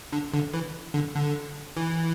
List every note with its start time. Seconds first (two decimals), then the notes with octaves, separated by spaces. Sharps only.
0.12 D3
0.34 D3
0.54 E3
0.94 D3
1.15 D3
1.77 E3